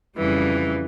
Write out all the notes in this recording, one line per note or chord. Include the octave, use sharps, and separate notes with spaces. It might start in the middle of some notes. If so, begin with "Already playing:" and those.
F2 C#3 E3 G3